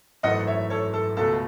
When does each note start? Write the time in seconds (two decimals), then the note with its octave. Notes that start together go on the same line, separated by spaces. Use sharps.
0.23 G#1 F#2 E3 A3 D#5 F#5
0.47 C#5 E5
0.70 A4 C#5
0.93 A4
1.17 C#2 B2 A3 A4